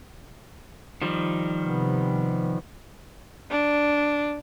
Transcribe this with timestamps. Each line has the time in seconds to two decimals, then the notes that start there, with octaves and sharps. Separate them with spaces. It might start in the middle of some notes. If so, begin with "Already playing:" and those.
1.02 D#3 F3 G3
1.66 C3 B3
3.51 D4